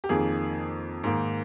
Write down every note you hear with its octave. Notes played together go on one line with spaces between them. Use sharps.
G4
F2 D#3 A#3 G#4
G#2 D#3 A#3